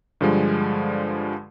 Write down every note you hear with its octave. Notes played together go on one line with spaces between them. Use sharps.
G2 D3 F3 G3 G#3